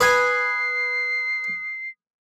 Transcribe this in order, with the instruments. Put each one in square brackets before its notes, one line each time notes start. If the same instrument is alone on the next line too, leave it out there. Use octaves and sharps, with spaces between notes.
[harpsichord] B4 G#5 [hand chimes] D#6 F#6 [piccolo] C7